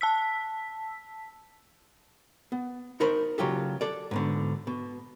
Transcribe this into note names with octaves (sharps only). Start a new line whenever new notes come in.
A5 E6 B6
B3
D#4 F#4 A#4 C5 B5
C#3 F#3 F4 G4 A4
A4 D5
G#2 B2 D3
B2